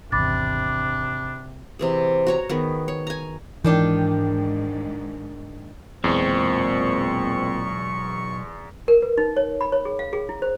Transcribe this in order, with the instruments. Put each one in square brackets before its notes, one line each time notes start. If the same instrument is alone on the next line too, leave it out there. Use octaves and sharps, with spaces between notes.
[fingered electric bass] G#1 E2 [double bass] C3 [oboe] D4 [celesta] B5 D6 A6
[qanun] C3 E3 G#4
F#4 C#5 A#5
D#3 B3 G#4
C#5
G#5 A#5
[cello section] G#2 [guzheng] D#3 D4 G4 [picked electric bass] E3
[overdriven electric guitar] B1 G#3 [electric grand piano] E2 [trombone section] A#2 C4 [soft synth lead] C#6
[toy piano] A#4
B4
D#4
C#5
B5
C#5
G#4
F5
G#4
E4
C5